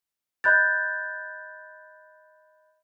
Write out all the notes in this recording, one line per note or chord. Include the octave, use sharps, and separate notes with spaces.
D#5 B5 F#6 G6 A6